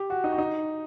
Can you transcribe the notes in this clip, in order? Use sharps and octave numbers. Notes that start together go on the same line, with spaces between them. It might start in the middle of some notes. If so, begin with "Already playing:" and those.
Already playing: G4
F#4
D#4
F#4
D#4